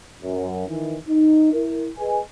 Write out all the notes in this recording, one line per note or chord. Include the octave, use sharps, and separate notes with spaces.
F#2
D#3 E3
D#4
E4 A#4
G#4 B4 D#5 G#5